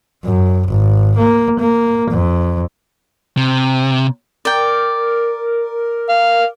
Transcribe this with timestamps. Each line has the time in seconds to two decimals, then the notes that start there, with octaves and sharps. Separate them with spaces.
0.24 F#2
0.68 G#1
1.18 A#3
1.60 A#3
2.11 F2
3.37 C3
4.45 A#4 D5 G5
6.09 F5